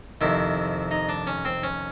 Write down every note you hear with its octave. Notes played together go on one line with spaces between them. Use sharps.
F2 C3 D#3 E4
D#4
D4
C#4
C4
C#4